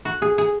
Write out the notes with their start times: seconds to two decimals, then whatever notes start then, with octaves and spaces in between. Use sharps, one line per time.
0.05 F#4
0.22 G#4
0.38 G#4